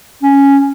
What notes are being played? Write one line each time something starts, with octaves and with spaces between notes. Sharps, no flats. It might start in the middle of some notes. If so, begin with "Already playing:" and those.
C#4